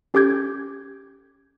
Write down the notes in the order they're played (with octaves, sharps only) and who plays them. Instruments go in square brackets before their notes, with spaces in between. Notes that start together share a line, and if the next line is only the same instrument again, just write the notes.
[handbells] C#4 G4 A4 D6 G6 G#6